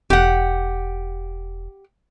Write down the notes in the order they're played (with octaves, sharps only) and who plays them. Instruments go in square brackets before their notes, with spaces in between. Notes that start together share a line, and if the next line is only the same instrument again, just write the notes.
[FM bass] E1 [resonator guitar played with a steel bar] G4 F#5